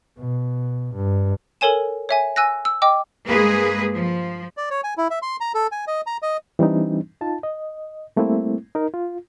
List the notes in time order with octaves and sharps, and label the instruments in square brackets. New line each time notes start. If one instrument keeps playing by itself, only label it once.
[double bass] B2
G2
[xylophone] A4 A#4 C#5 G#5 E7
C#5 E5 G#5
G#5 E6 F#6 A#6
E6
D#5 G5 D6
[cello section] G2 G#3 A#3 G#4 B4
F3
[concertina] D5
C#5
G#5
E4
E5
C6
A#5
A4
G#5
D#5
A#5
D#5
[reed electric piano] E3 G3 C4 D4 D#4
D#4 F4 A5
D#5
G3 A3 A#3 C4 E4
D#4 A#4
F4